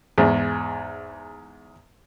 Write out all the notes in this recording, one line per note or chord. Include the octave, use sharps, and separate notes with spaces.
E2 G#2